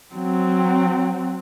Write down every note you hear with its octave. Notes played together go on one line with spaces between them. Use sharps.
F#3 C4